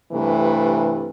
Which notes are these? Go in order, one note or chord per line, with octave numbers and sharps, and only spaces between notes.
G2 C3 E3 A3